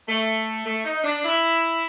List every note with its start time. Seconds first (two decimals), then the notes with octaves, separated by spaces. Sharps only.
0.07 A3
0.65 A3
0.84 D#4
1.03 D4
1.24 E4